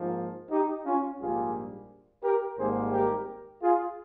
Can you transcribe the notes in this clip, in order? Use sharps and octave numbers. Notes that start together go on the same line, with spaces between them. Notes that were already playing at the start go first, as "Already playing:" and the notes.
Already playing: G#2 F3 A#3
D#4 G4
C#4 F4
A#1 G#2 G3 A#3 F4 G#4
G4 A#4
G#1 G#2 G3 A#3 G#4 C5
G4 A#4
F4 G#4